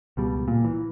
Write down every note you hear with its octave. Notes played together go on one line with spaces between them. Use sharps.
C#2 B2 G3
A#2
E3